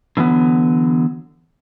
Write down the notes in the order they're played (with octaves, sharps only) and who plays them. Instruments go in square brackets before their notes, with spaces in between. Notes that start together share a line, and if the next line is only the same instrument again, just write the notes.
[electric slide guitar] D3 E3 F#3 B3